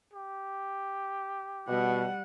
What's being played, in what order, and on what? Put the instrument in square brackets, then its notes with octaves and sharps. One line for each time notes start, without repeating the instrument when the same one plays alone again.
[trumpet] G4
[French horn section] B2 [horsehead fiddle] G3 F#5